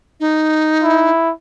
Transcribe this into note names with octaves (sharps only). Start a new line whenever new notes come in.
D#4
E4